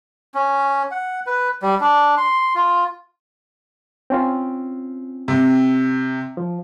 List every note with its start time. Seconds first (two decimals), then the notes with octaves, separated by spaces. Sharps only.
0.35 C#4
0.91 F#5
1.26 B4
1.62 G3
1.81 D4
2.18 C6
2.55 F4
4.10 C4 C#4 F4
5.28 C3
6.37 F3